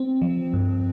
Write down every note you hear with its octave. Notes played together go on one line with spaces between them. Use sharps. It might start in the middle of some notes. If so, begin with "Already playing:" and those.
Already playing: C4
F3
G2